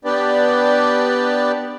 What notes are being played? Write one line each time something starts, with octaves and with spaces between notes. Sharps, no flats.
B3 D4 G4 B4 D5